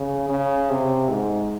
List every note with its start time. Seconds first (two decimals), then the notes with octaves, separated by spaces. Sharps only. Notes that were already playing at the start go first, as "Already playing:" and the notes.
Already playing: C#3
0.29 C#3
0.70 C3
1.09 G#2